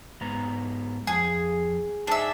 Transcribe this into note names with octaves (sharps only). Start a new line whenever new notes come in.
G#2 B3 A#5
F2 G#4
D4 D#4 G#4 E5